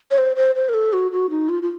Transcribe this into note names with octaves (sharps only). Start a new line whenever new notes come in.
C#5
C5
C5
C5
A#4
A4
F#4
F#4
D#4
F4
F4